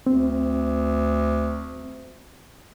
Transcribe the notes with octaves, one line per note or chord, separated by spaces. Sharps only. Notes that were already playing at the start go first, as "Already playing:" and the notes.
D2 C4